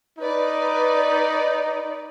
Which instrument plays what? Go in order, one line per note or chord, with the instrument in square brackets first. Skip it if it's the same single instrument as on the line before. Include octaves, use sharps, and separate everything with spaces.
[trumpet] D#4 [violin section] B4 D5